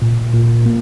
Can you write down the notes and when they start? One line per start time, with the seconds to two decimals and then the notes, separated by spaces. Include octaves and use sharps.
0.02 A#2
0.34 A#2
0.66 A#3